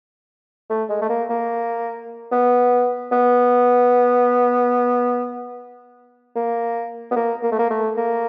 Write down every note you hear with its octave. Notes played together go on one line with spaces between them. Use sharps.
A3
G#3
A3
A#3
A#3
B3
B3
A#3
B3
A#3
A#3
A3
A#3
A3
A#3